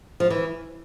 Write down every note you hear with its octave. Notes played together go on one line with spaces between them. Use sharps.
F3
E3